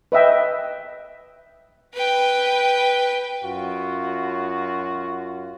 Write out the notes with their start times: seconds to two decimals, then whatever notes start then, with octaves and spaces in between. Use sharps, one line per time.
0.12 B4 D#5 E5 G5
1.95 B4 G5
3.44 F#2 F4 F#4